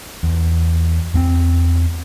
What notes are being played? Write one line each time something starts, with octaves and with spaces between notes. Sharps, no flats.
E2
E2 A#3 C4